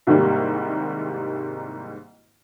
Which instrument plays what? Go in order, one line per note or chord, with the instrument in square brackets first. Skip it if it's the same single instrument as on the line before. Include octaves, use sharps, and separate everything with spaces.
[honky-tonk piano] C2 G#2 D#3 G3 A#3